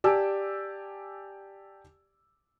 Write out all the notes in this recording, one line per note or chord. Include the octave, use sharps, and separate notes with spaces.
G4 D5 G#5 A5 D6 E6